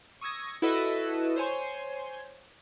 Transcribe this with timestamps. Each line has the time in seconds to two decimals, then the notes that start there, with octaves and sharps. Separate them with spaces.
0.21 C#6 D#6 E6 G#6 A#6
0.62 E4 F#4 A4 B4 D#5 E6
1.36 C5 C#5 G#5 C6